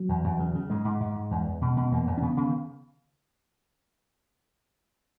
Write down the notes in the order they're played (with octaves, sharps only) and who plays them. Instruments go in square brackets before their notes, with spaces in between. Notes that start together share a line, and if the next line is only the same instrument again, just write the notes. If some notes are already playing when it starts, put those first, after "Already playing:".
Already playing: [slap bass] F#3
E2
E2
C#3
C#3
G#2 G#3
G#2
G#2
G#2
E2
E2
B2
B2
E2 A#3
E2
C#4
C#3 B3
C#3
D#3